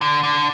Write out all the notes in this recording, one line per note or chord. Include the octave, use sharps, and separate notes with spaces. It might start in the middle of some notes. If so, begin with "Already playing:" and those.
D3
D3